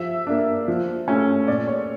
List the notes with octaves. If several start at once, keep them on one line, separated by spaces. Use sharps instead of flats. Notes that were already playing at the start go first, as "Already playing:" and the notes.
Already playing: F3 E5
A#3 D4
F3
A3 C#4
A#2 D5
C#5